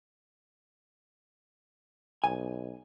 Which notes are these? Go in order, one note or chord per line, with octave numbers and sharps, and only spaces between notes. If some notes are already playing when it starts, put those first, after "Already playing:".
B1 G#5